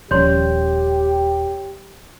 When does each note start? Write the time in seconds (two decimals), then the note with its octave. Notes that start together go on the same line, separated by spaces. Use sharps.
0.11 D#1 F3 C#4 G4 C#5 C6 G6